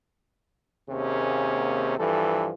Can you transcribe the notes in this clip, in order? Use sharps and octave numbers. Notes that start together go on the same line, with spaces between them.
D#2 C3 A#3 C#4 G#4
G2 E3 F3 A4